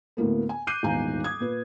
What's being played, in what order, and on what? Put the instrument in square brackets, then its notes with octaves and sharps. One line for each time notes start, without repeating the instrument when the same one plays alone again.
[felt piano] D2 A2 A#3 B3
G#5
D6 F#6 G6 C7 D#7
D#1 E2 G#2 F5 G#5 A#5
D#6 G#6
A#2 B4